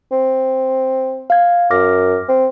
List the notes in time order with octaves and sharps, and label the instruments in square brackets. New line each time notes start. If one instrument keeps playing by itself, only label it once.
[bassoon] C4
[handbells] F5 G#6
[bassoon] F#2 [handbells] D6 F6 A#6
[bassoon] C4